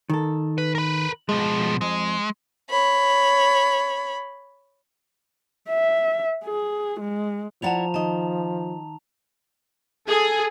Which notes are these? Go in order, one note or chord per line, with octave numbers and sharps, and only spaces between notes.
D#3 A4
B4
A#4 B4
B2 F3 G#3
F2 G#3
C#5 B5
E5
G#4
G#3
F3 E4 D5 F#5 A5 A#5 F7
D#3 D#5 A5
G#4 A4 G#5